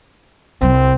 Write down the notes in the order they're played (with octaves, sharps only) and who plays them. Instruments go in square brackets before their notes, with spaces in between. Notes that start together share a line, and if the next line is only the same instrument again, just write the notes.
[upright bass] C2 G3 [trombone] C4